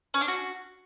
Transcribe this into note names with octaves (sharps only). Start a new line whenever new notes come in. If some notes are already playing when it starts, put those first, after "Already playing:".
C#4
D4
F#4